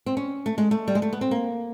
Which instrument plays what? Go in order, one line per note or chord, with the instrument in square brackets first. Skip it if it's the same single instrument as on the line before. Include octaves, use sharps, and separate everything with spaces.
[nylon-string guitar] C4
C#4
A3
G#3
A3
G3
G#3
A3
B3
C4
A#3